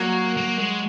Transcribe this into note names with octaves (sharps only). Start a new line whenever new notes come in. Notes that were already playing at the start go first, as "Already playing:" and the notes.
Already playing: F#3 A#3 F#4
A#3
G#3